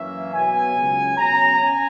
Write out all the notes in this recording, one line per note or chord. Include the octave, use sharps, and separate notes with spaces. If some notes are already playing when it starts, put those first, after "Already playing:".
Already playing: F#2 E3 A#3 C#4 E5
B2 F#3 B3 G#5
C#2 C#3 F#3
B2 F#3 C#4 A#5
C#4 G#5